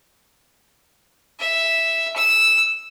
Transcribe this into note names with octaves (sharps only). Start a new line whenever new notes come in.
E5
E6